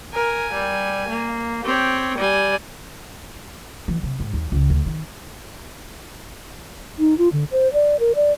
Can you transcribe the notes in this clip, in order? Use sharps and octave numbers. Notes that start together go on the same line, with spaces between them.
A#4 G#5
G3
A#3
C4 G4 C#5
G3 D5 G#5
E3
C3
G#2
D#2
C#2
D2
D#3
D#4
F4
D3
C5
D5
A#4
D5